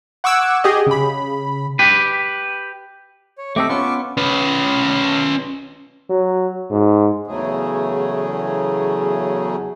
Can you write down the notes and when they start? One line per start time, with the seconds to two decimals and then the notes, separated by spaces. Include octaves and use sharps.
0.24 F#5 C#6 D6 E6 F#6 G#6
0.64 G4 G#4 D#5
0.87 C#3 B5
1.79 G4 B4
3.38 C#5
3.56 A3 C4 G4 A4 D#5 D6
3.69 B3 C#4 F4 C#6 E6
4.17 C#4 B4
6.10 F#3
6.71 G#2
7.27 E2 C#3 F#3 A3 G#4